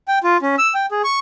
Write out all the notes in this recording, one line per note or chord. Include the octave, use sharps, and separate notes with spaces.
G5
F4
C#4
E6
G5
G#4
C#6